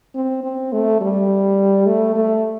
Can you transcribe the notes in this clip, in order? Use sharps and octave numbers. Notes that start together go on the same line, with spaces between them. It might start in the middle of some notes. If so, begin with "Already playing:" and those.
C4
C4
A3
G3
A3
A3